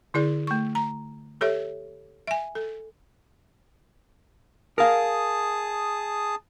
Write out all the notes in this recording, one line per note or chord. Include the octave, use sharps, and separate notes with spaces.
D3 E4 G#4 D5
A3 C#6
A#5
G4 A4 C#5 E5
E5 G#5
A4
G#4 A#4 F5 A5 D#6